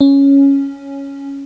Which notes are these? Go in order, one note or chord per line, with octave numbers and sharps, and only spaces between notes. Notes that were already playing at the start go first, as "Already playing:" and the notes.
C#4